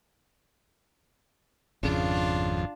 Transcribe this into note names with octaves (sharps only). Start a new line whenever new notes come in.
G#1 F2 C#3 D4 F4